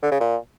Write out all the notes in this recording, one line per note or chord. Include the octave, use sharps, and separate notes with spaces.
D3
C#3
A#2